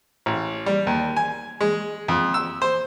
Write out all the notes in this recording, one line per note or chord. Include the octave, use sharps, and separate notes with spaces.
A1
G3
D#2
G#5
G#3
F2
E6
C5